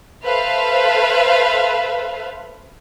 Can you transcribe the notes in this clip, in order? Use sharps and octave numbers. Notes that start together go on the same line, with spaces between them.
A4 B4 C5 E5 F5